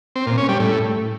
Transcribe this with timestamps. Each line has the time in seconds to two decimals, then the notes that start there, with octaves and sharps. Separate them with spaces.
0.16 C4
0.27 A#2
0.38 C#4
0.49 G3
0.60 A2